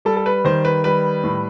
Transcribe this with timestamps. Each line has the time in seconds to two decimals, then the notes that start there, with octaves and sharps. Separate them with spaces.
0.05 G3 A4
0.17 A4
0.26 B4
0.44 D#3 C5
0.65 B4
0.84 G3 B4
1.24 A2